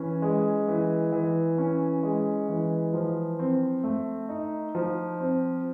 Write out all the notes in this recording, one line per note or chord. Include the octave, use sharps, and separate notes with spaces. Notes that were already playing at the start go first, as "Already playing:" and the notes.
Already playing: E3 C#4
G#3
E3
E3
C#4
G#3
E3
F3
C4
A3
D#4
F3
C4